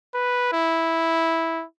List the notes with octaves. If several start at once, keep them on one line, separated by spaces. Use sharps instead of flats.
B4
E4